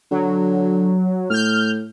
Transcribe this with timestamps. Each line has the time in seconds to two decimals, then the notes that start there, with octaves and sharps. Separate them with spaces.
0.11 D3 F#3
1.30 A2 F6 G6